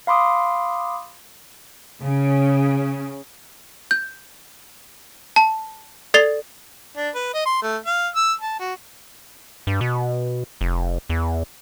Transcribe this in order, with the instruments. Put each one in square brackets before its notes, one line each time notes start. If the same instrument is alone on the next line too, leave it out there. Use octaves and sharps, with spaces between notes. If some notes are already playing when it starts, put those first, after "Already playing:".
[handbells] F5 B5 C6 D6 D#6
[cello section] C#3
[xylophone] G6
A5
A4 D5 A6 C7 F7 G7
[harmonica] D4
B4
D#5
C6
A3
F5
E6
A5
F#4
[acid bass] G2
B2
F1
E2